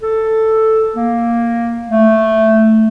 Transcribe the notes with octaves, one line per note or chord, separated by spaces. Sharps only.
A4
A#3
A3